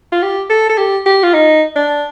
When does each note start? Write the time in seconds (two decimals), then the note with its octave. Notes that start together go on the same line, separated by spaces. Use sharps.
0.12 F4
0.22 G4
0.50 A4
0.69 A4
0.78 G4
1.06 G4
1.23 F4
1.34 D#4
1.76 D4